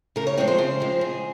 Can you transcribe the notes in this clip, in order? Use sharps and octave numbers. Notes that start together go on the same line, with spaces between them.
C#3 A#4
C#5
F3 G#3 C4 C#5
C5
C#3
F3 G#3 C4
C#3 G#4